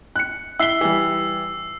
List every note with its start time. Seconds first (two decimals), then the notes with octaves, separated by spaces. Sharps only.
0.16 F#6 C#7
0.59 E4 E6 B6 C7 G7
0.81 E3 G3